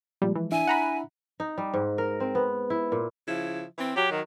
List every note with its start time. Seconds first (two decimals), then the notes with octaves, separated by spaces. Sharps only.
0.22 A#2 F3 G3 G#3
0.36 E3
0.52 D4 E4 E5 G#5
0.67 F#5 A#5 B5
1.40 D#4
1.58 G3
1.74 G#2
1.98 A#4
2.20 C4
2.35 B3
2.70 E4
2.92 A#2
3.28 C#3 F3 E4
3.78 E3 C4
3.97 F#3 G4
4.11 D#3